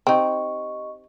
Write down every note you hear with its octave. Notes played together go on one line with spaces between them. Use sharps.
C4 D#4 G4 D#5 C#6